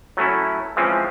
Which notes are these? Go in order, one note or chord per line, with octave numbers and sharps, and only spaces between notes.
F#3 A3 C#4 E4
E3 F3 G#3 C4 C#4